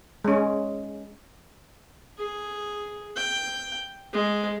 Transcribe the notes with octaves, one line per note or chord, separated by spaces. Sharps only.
G#3 C#4
G#4
G5
G#3